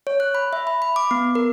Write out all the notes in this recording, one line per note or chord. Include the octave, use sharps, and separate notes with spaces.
C#5
F#6
B5
E5
B5
B5
D6
B3
A#4